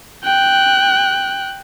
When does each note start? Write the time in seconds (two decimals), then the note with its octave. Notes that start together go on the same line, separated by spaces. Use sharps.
0.24 G5 F#6